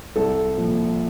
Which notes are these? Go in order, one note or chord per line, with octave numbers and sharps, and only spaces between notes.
C2 A4
A#2 F3